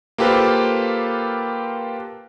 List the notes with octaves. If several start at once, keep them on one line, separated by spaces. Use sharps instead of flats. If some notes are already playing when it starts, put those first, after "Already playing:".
A#3 F4 G4 A4 B4 C5